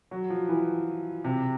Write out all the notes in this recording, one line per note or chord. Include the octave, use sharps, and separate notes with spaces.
F#3
F3
E3
C3